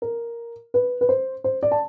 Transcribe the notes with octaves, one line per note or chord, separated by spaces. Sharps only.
A#4
B4
B4
C5
C5
D5
A5